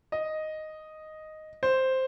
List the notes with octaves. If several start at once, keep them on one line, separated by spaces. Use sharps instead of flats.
D#5
C5